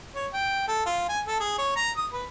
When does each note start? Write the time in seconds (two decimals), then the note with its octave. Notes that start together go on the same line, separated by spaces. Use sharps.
0.15 C#5
0.34 G5
0.68 A4
0.86 F4
1.09 G#5
1.27 A4
1.40 G#4
1.58 C#5
1.76 A#5
1.97 D#6
2.13 B4